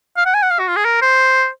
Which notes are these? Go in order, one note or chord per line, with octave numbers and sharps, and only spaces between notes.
F5
F#5
G#5
F#5
F5
F#4
F4
G#4
A#4
C5